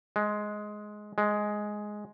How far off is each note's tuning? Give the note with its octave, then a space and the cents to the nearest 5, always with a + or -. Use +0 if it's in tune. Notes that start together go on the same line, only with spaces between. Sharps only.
G#3 +10
G#3 +5